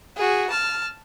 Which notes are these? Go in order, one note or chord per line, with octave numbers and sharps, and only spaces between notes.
F#4 G#4
A5 F6